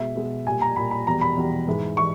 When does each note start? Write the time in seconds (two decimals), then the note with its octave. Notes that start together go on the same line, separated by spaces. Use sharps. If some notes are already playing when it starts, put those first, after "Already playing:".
Already playing: B2 G#3 E5
0.16 B2 G#3
0.46 A#2 G3 G#5
0.61 A#5
0.76 A#2 G3 B5
0.91 B5
1.07 E2 B2 G3 A#5
1.21 B5
1.36 E2 B2 G3
1.67 G#2 E3 G#3
1.97 E3 C#6